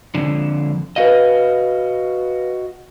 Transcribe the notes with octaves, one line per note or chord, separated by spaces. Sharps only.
F2 D3
F#4 B4 D#5 F5